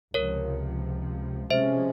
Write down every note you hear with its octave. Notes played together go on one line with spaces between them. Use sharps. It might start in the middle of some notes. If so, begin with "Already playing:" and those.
C#2 C3 F3 A#4 C#5
C3 F3 G#3 C#4 C5 E5